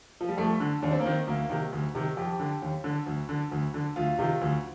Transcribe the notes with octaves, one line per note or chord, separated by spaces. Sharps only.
F3
G3
F2 A3
D3
D#2 D4
C4
A#3
D#3 C4
D2 A#3
C3 D#3
D2
C3 D#3
F2 G4
D3
D#2
D3
D2
D3
D2
D3
D2 F4
C3 D#3
D2